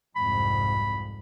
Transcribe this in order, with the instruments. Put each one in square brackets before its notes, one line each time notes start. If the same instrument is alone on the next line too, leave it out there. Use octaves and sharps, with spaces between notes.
[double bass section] C2 F2 G#2 [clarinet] B5